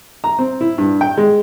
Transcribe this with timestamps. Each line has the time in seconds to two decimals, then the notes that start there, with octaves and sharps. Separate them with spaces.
0.24 A#5
0.39 C4
0.61 E4
0.78 G2
1.01 G5
1.18 G#3